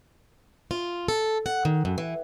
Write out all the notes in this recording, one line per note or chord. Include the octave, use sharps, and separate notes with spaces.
F4
A4
F#5
D#3
F#2
E3